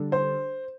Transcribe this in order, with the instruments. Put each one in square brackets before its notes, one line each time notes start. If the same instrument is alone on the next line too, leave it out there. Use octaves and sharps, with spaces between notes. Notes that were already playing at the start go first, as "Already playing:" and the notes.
Already playing: [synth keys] D3 G3 D4 A4
[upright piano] C5